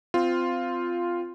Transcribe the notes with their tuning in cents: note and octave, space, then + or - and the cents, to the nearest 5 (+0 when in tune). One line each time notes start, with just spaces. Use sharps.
C4 -20 F4 -5